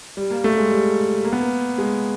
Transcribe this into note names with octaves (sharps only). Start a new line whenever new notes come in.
G3
A#3
A3
G#3
G3
A#3
B3
A#3
G#3